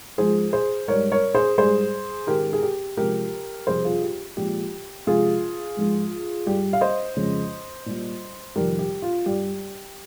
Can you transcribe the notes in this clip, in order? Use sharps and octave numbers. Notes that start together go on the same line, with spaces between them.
G#2 F3 G#3 G#4 C5
G#4 C5
G#2 G3 A#4 C#5
A#4 C#5
G#4 C5
G#2 G3 G#4 C5
G#2 D#3 G#3 G4 A#4
G#4
G4
C3 F3 G#3 G4 A#4
F2 C3 G3 G#4 C5
F4 G#4
G4
A#2 F3 G#3 G4
C3 F3 G#3 F4 G#4
G#2 F3 G#3
G2 G3 G4
F5
C5 D#5
F2 C#3 G#3
A#2 G3
F2 C3 D#3 G3 G4 A#4
G4
F4
G2 G3 G4